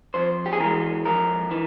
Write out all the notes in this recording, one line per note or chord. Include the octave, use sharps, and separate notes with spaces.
F2 C5
G4
G#4
E3 G#3 A#4
F2 A#4
E3